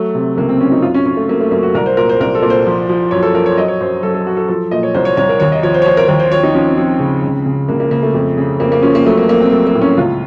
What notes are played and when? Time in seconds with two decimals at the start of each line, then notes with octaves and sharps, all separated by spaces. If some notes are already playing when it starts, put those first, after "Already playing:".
Already playing: F#3 A3
0.15 C3
0.37 C#2 A#3
0.49 C4
0.61 F#3 C#4
0.72 D#4
0.82 F#2 F4
0.94 C#4
1.05 F#2 C#4
1.17 A3
1.28 F#3 A#3
1.41 A3
1.51 F#2 A#3
1.63 F#4
1.75 C2 A#4
1.86 C5
1.97 A#2 A#4
2.09 C5
2.20 C2 A#4
2.35 A4
2.42 A#2
2.50 C5
2.66 F3
2.89 F3
3.11 F#2 C#5
3.22 A4
3.35 F3 A#4
3.46 C#5
3.58 F#3 D#5
3.68 C#5
3.81 F#2 C5
4.03 F#3 A4
4.15 A4
4.26 F#3 F#4
4.37 A4
4.48 F3 A4
4.71 A#2 D#5
4.83 C#5
4.94 C2 C5
5.05 C#5
5.17 C2 C#5
5.29 A#4
5.40 D#2 C#5
5.52 D#5
5.63 F3 C#5
5.74 C5
5.82 C#5
5.86 F3 C5
5.97 A#4
6.08 D#2 A#4
6.20 C5
6.32 F3 C#5
6.43 D#4
6.54 F3 C#4
6.65 C4
6.77 F3 C4
7.00 C#3
7.24 C#2
7.46 C#3
7.69 C#2 A#3
7.80 A#3
7.91 C#3 A#3
8.03 A3
8.14 F2
8.37 C#3
8.60 F2 A#3
8.72 A#3
8.82 F3 C#4
8.95 A#3
9.06 F#3 A3
9.17 A#3
9.28 F#3 A#3
9.40 C4
9.51 F#3 A3
9.67 A#3
9.75 A2
9.82 C#4
9.97 C#2 F4